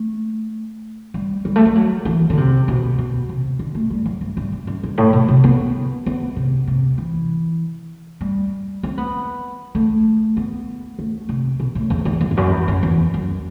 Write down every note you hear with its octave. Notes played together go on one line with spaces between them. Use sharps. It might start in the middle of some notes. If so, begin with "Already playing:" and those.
Already playing: A3
G3
G3
A3
G3
F#3
E3
D3
C3
B2
B2
C3
D3
A3
G3
F#3
G2
G2
G2
F#2
G2
A2
B2
C3
B3
B3
C3
C3
E3
G3
C4
B3
A3
B3
A3
C3
B2
A2
E2
E2
F#2
E2
F#2
E2
F#2
E2
F#2